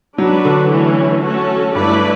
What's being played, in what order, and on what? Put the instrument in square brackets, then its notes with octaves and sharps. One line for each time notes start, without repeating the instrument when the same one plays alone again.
[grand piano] F#3 [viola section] D4 F#4 B4
[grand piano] D3
[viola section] E3 A3 C#4
A3 C#4 F#4 A4
[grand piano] G2 [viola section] A3 E4 B4 D5